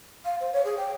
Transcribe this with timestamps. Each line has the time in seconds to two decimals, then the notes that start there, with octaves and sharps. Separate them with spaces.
0.25 F5
0.41 C5
0.53 C#5
0.65 G#4
0.77 G5